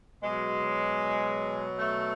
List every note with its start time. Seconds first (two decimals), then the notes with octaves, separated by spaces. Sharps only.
0.22 B2 F#3 G#3
1.79 A3